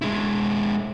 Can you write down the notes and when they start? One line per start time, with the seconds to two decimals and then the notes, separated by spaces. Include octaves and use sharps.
0.02 G#3 E4